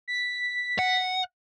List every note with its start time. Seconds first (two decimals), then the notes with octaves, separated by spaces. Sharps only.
0.08 B6
0.79 F#5